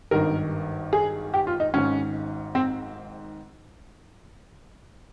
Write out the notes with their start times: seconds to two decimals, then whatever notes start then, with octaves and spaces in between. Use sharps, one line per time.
0.11 G#1 G2 D#3 A#4
0.93 G#4
1.34 G4
1.47 F4
1.60 D#4
1.74 G#1 G#2 D#3 C#4
2.55 C4